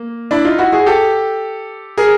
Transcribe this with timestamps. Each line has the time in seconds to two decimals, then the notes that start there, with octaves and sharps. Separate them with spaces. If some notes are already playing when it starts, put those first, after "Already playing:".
Already playing: A#3
0.31 D4 E4
0.45 D#4 F4
0.58 E4 F#4
0.72 F#4 G#4
0.86 G4 A4
1.98 G#4 A#4